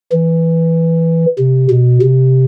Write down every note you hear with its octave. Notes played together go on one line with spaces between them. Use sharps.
E3
C3
B2
C3